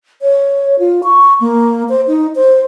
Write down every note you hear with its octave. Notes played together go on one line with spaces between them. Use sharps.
C#5
F4
C#6
A#3
C5
D#4
C5